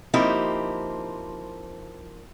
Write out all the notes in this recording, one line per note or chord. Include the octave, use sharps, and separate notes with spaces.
F3 A#3 C4 D#4 E4 G4